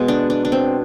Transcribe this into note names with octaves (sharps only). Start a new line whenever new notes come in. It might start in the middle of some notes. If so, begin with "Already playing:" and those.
Already playing: B2 G#3 B3
D4
D4
D4
C4